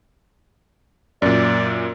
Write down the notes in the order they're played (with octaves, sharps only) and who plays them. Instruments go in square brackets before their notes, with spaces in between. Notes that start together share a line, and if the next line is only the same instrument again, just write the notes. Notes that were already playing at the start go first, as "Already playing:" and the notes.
[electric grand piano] F#2 A#2 [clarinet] D5